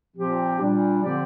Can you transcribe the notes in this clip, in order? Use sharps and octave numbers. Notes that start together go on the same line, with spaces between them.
A#2 F3 C4 G4
A#2 G3 D4
D3 F3 C4 G4 D5